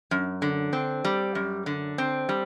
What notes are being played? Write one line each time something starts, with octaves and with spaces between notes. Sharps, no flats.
F#2
D3
C4
G3
F#2
D3
C4
G3